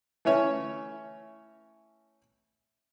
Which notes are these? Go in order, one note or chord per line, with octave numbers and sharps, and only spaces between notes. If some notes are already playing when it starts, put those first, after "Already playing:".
E3 A3 C#4 C#5